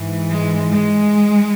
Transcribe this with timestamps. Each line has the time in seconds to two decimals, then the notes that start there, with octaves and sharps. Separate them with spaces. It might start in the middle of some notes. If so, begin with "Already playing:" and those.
Already playing: G#2 E3
0.31 G#3
0.71 G#3